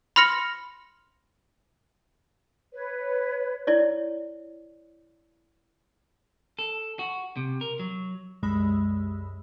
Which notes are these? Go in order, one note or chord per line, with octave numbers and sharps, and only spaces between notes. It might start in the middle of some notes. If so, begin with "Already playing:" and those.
B5 C6 F6 A#6 C#7
B4 C#5
E4 C#5 D5
A4
F#4
C3
A#4
F#3
C2 F#2 G#3 B5 E6